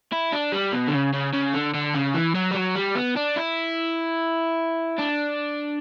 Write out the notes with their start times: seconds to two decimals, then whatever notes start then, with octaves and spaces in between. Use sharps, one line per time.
0.13 E4
0.32 D4
0.52 G3
0.73 B2
0.88 D3
0.93 C#3
1.13 C#3
1.33 C#3
1.54 D3
1.74 D3
1.94 C#3
2.14 E3
2.35 F#3
2.51 G3
2.55 F#3
2.76 G3
2.95 B3
3.16 D4
3.36 E4
4.98 D4